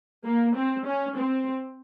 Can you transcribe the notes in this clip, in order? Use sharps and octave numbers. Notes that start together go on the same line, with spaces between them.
A#3
C4
C#4
C4